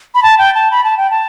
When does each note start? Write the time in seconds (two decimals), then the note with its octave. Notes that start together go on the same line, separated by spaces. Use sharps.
0.15 B5
0.23 A5
0.38 G5
0.55 A5
0.71 B5
0.84 A5
0.97 G5
1.10 A5